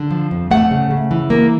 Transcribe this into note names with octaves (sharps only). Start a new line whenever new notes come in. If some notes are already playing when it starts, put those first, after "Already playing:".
Already playing: D3
F3
F2
A3 F#5
C#3
C#3
E3
A#3